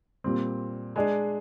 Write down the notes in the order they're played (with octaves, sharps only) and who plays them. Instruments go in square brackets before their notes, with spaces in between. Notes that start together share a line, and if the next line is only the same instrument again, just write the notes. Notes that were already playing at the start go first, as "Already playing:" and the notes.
[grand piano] A#2 G3 C4
G#3 D4 G#4 D5